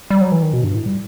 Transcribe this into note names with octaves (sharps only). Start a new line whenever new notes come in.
G3
F#3
E3
D#3
B2
G2
A2
G3